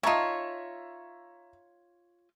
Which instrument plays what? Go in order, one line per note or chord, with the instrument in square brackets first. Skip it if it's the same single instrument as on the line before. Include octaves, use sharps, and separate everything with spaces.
[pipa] D#4 A5 [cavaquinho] F4 C#5 [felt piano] E5 A#5